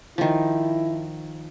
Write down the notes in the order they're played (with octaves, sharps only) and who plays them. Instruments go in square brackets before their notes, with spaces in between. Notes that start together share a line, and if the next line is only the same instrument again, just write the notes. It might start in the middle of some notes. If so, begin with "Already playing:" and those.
[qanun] D#3 F3 [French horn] E4